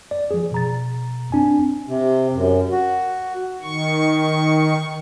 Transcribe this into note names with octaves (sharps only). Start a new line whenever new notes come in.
D5
F3 G#4
B2 A#5 A6
C4 D4 G#5
C3
F#2
F#4
D#3 C#6